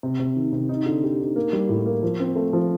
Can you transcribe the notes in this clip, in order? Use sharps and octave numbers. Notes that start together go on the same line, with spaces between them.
C3
C3
D#3
C3
D#4
D3
G4
D#4
A#3
G3
A2
A#3
F3
C4
A3
F3